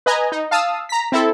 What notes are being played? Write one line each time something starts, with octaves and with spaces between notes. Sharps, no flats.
B4 D#5 G#5 A#5
D#4
F5 A5 D#6 E6
A#5 B6
C4 E4 A4